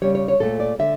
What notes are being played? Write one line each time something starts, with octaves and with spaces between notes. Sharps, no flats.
C#3 G3 C#5
C#5
C#5
A#2 A3 A4
D5
D3 E5